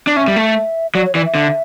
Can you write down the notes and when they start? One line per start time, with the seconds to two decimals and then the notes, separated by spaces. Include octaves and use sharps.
0.07 D4
0.16 C#4 E5
0.28 G3
0.36 A3
0.95 F#3 D5
1.06 C#5
1.15 E3 D5
1.25 E5
1.35 D3